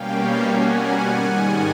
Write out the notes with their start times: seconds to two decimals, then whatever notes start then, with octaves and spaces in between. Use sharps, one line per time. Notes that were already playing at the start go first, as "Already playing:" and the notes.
Already playing: B2 G3 A#3 C#4 F5 G5
0.16 F5 G5
0.45 B2 G3 A#3 C#4 F#5 G#5
1.05 G#2 D#3 G3